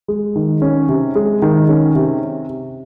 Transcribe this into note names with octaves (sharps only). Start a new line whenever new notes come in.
G#3
D#3
C#4
C3
G#3
D#3
C#4
C3